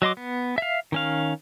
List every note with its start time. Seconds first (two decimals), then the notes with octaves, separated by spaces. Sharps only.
0.02 F#3 D#5 C6 D6
0.17 B3
0.58 E5 F5
0.92 D#3 C#4 F5